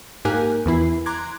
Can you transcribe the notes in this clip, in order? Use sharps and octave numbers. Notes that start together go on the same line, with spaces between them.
G#2 A#3 G4 A#4 G#5 F#6
E2 E3 E4 C7
A#5 C6 D6 F#6 G#6